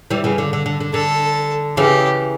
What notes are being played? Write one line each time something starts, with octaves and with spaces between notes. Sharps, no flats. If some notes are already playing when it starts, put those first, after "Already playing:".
E3 G3
C#3 E3
D3
D3
D3
D3
D3 A4
C#3 E3 G4